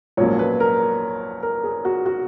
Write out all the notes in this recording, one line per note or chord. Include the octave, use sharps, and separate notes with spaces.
A#1 G#2 F#3 A#3 C#4 C#5
B4
A#4
A#4
G#4
F#4
F#4